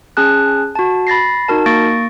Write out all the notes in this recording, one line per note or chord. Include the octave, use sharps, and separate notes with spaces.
C#4 G#4 A5 F#6
F#4 A5
B5 A6 A#6 C7
D#4 F#4 A#4 A5
A#3 C#6 A6 A#6 D7